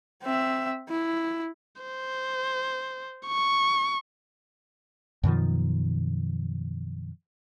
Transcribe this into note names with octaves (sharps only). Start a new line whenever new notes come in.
C4 E5
E4
C5
C#6
F#2 B2 D#3 F3